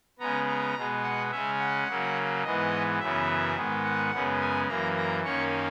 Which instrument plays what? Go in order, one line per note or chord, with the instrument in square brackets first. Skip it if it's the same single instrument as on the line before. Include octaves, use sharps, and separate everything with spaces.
[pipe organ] C#3 G#3 B3 A#5
A#5
B2 G#3 B3
F#5
C#3 G#3 C#4 E5
F#5
C#3 F#3 A#3
G#2 E3 G#3 B3 D#5
F#2 C#3 E3 B3 E5
G#2 D#3 G#3 B3
F#5
F#2 C#3 G#3 B3
G#5
F#2 E3 A#3 A#5
A#5
F#2 D#3 A#3 C#4 C#6